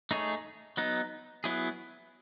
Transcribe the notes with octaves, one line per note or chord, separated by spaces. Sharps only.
A3 D#4 G#4 C#5
F#3 B3 D#4
F#3 B3 E4 G#4